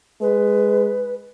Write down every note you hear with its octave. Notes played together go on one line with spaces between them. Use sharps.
G#3 B4